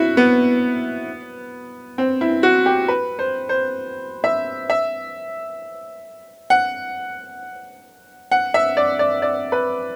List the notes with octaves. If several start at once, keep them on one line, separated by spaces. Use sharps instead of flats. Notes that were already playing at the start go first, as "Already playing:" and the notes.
Already playing: E4 F#4
B3
C4
E4
F#4
G4
B4
C5
C5
E5
E5
F#5
F#5
E5
D5
D5
D5
B4